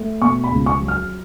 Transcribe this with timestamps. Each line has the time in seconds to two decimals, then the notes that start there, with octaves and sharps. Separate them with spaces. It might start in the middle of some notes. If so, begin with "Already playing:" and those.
Already playing: A3
0.22 B2 C#6
0.44 B5
0.51 C#2
0.66 C#6
0.81 F#3
0.88 F6